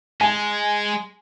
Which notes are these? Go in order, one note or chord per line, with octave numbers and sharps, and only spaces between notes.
G#3 G#5